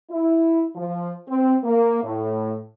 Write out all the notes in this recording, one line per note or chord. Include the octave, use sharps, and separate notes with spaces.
E4
F3
C4
A#3
A2